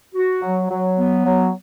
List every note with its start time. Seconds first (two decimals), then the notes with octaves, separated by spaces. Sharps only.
0.15 F#4
0.42 F#3
0.70 F#3
0.97 B3
1.25 F#3